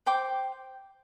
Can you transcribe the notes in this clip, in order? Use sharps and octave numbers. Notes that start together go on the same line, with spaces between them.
C5 G5 D6